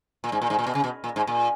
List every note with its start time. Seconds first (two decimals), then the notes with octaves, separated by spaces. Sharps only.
0.24 A#2
0.32 G#2
0.42 A#2
0.50 G#2
0.59 A#2
0.67 B2
0.75 C#3
0.84 B2
1.04 A#2
1.16 G#2
1.27 A#2